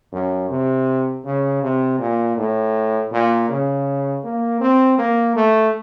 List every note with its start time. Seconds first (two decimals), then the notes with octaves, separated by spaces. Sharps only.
0.12 F#2
0.50 C3
1.25 C#3
1.62 C3
1.99 A#2
2.37 A2
3.12 A#2
3.49 C#3
4.23 A#3
4.61 C4
4.98 A#3
5.36 A3